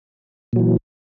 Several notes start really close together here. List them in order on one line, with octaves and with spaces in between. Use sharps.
A#2 F#3 E3